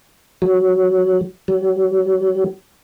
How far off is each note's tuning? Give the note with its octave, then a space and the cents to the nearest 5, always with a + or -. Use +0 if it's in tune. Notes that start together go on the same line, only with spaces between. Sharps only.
F#3 +5
F#3 +35